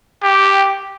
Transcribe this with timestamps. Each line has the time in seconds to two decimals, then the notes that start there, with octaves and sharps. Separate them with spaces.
0.23 G4